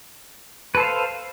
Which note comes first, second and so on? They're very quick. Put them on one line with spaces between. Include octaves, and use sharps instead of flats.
B4 A4 C5 F5